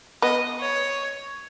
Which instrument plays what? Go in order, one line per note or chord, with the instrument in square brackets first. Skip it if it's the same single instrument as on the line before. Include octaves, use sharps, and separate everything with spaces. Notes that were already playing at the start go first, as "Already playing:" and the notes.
[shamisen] B3 [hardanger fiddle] D#5
[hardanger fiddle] C#5